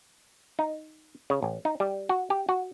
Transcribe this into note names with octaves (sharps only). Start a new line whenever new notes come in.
D#4
C#3
A1
D#4
G3
F#4
G4
F#4